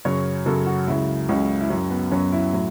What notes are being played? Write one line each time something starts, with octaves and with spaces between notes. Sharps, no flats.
F#2 C#3 F#3 C#5
F#2 C#3 F#3 A4
F#4
C#2 C#3 F#3 E4
C#2 C#3 F#3 C#4
E4
F#2 F#3 C#4
B3
F#2 F#3 C#4
E4
A2 F#3 E4